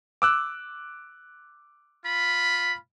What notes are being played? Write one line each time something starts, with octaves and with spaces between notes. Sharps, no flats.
D6 E6 F#6
F4 B5